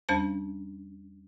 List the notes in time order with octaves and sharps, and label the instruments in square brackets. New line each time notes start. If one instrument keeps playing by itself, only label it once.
[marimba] E2 G3 C#4 D4 C5 A5